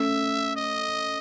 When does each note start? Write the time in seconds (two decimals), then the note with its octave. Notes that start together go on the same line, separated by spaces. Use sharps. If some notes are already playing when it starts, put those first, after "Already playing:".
Already playing: A3 C#4 E5
0.56 D#5